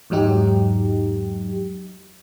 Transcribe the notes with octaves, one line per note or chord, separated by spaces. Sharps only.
E2 G#2 F#3 D#4 G4